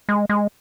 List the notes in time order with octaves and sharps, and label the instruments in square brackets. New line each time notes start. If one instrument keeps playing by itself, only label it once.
[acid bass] G#3
G#3